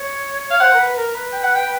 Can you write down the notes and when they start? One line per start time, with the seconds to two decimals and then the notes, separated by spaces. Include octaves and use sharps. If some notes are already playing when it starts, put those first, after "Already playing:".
Already playing: C#5
0.51 F5
0.60 C5 F#5
0.73 A#4
0.78 B4
0.97 A#4
1.15 B4
1.33 G5
1.43 F#5
1.55 G5